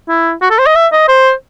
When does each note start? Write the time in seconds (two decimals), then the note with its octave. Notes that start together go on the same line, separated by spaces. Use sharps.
0.09 E4
0.42 F#4
0.51 A4
0.59 C5
0.67 D#5
0.76 E5
0.92 D#5
1.08 C5